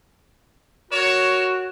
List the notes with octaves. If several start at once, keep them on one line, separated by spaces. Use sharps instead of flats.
F#4 A#4 C#5 E7